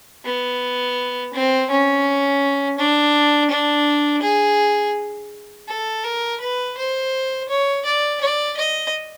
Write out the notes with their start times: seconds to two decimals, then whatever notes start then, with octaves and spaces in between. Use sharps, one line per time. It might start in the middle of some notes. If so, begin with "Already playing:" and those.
0.25 B3
1.33 C4
1.70 C#4
2.78 D4
3.50 D4
4.22 G#4
5.68 A4
6.03 A#4
6.40 B4
6.77 C5
7.49 C#5
7.85 D5
8.21 D5
8.57 D#5